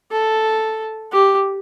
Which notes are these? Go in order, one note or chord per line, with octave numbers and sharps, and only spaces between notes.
A4
G4